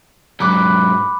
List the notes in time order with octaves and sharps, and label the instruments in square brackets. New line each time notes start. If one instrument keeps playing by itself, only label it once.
[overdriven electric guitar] G#2 F#3 [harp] B5 D6 F#6